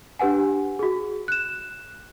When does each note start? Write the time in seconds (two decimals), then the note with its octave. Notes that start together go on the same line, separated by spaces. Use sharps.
0.19 D4 G4 B4 F#5 G#5
0.79 F#4 G#4
1.28 F#6 E7